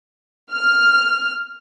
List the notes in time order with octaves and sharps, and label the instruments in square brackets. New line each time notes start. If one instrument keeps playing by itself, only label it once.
[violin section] F6